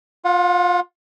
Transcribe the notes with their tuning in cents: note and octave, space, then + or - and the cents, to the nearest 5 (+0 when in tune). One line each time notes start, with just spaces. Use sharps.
F4 +15 F#5 -35